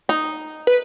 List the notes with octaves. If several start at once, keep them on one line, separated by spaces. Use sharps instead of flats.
D#4
B4